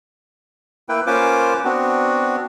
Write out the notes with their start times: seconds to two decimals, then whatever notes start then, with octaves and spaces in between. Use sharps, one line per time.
0.89 A#3 E4 B4 G5
1.07 A#3 C#4 F4 B4 C5 D6
1.65 B3 C4 D4 F#4